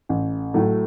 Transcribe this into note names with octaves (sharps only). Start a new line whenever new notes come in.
A1
A2 F#3 A3